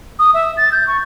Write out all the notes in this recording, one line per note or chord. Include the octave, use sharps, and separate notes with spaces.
D#6
E5
A6
G6
C#6